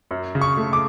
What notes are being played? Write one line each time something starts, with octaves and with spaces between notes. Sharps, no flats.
F#2
C#3
C#6
A3
D6